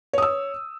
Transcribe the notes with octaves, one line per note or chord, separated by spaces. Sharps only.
C#5 D#6 E6